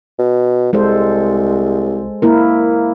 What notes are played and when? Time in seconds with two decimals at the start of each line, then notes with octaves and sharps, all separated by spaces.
0.19 B2
0.73 C2 G#3 A4 C5
2.22 A#3 E4 A#4